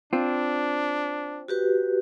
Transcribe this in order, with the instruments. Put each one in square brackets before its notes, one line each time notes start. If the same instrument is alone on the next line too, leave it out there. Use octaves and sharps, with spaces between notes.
[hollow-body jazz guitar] C4 F4 [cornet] D4
[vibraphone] F#4 G4 B4